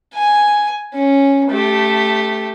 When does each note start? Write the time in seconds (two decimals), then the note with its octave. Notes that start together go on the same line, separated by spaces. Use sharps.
0.14 G#5
0.94 C#4
1.51 A3 G4